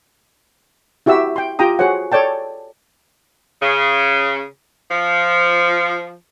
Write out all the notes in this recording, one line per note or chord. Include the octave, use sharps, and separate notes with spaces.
E4 F#4 G4 E5 E6
G5 C6
F4 G4 G5 A#5 D#6
F#4 G#4 C5 C#5 F#5
A4 C#5 D5 G5 A5
C#3
F3